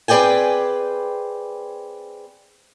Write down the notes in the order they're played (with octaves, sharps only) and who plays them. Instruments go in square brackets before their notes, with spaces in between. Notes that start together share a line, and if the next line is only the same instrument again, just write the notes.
[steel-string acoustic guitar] C4 G#4 B4 D5 G5 G#5